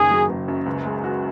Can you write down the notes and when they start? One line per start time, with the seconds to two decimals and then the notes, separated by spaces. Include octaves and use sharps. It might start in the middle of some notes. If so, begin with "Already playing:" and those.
Already playing: F#1 D#3 G#4
0.11 F#3
0.29 F#1
0.48 F#2
0.66 C#2
0.85 G#3
1.04 F#4